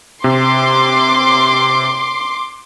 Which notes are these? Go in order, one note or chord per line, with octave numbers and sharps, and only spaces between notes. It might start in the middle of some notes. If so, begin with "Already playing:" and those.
C3 C6 D6